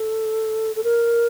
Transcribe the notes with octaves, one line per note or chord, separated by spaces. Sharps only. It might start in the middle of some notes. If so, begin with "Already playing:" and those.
Already playing: A4
A4
A#4